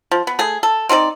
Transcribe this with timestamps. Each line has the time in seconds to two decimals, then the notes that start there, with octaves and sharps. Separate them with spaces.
0.11 F3
0.27 B3
0.39 A3 G#4
0.63 A4
0.89 C4 D#4 A4 D5